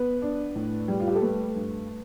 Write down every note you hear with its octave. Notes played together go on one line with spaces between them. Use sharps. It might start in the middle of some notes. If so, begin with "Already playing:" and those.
Already playing: B3 B4
D4
A2
G3
F4
G4
A4
A3 B4
G2